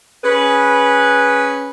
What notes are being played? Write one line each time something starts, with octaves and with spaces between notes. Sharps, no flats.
C#4 G#4 B4